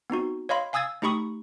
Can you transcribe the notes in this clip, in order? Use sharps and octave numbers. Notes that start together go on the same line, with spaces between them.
B3 C4 D#4 F#4
C#5 D#5 F5 B5 C6
F5 G#5 D#6 E6 G#6 A6
A3 D#4 G4 B5 C#6 D#6